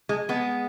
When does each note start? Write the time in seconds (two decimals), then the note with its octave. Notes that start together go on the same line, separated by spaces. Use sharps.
0.09 G#3
0.29 G#3 B3